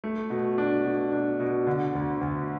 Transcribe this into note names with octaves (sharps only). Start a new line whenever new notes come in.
A3
B2
D4
B2
D4
B2
D3
D2
D2